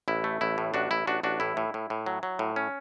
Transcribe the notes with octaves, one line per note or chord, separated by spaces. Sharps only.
A1 E4
A3
A1 E4
A2
A1 D4 F#4
A1 E4
A1 D4 F#4
A1 D4 F#4
A2 E4
A2
A2
A2
F#3
F#3
A2
C#4